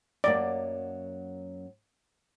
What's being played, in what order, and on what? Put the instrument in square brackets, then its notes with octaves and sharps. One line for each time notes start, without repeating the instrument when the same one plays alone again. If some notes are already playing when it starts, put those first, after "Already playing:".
[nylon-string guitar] F#2 F#3 A#3 [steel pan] D5